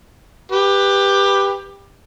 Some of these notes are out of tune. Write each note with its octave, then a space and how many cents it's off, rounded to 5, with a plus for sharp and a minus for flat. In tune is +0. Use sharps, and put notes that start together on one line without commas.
G4 +15 B4 +0